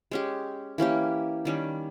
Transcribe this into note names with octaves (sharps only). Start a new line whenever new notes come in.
G#3 C#4 G4
E3 A#3 C#4 G4
D#3 G3 C#4